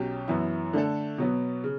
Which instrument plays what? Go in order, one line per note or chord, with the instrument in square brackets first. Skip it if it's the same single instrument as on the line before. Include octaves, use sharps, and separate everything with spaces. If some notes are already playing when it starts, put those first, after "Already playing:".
Already playing: [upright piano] B1 B2 F#3 C#4 G4
F#2 E3 B3 E4
D3 A3 D4 A4
B2 F#3 B3
C#3